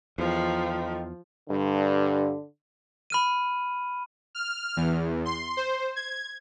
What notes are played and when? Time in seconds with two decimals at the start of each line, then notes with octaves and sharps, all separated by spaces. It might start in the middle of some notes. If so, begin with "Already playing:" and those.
0.18 E2 D3 D#3 F3
1.50 G2 D3
3.10 B5 F6 D#7
4.35 F6
4.77 E2
5.25 C6
5.57 C5
5.96 G#6